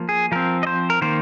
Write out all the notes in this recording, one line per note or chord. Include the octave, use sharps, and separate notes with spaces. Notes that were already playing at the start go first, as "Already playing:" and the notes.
Already playing: F3 A#3
G#4
F3 C4 A#4
D#5
C5
A#4
D#3 A#3 C5